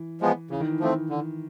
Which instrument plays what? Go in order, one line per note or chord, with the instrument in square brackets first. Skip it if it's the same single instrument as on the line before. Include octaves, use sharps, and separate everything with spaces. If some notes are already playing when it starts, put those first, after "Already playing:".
Already playing: [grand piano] E3
[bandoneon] F3 G#3 B3
[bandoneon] C#3 [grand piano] E3
[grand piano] D#3
E3
[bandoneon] F3 A3 C4
D3